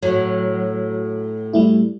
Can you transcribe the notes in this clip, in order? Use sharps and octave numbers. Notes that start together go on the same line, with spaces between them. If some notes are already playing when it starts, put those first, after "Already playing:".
A2 F#3
G3 A3 E4